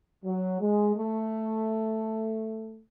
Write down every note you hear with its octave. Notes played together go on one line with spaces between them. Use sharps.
F#3
G#3
A3